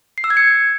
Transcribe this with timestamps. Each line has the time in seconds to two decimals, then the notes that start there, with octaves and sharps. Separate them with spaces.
0.18 C7
0.24 E6
0.30 G#6
0.37 C#7